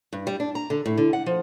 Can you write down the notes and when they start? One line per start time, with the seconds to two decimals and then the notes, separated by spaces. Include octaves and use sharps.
0.13 G2
0.27 G3
0.40 D4
0.55 A#5
0.70 D3
0.86 A2
0.98 D3
1.13 F#5
1.26 F3